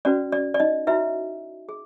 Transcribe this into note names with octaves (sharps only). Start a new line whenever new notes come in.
C#4 F#4 B4 D5
D5
D5
D#4 D#5
D#4 E4 F#4 B4 E5
G#4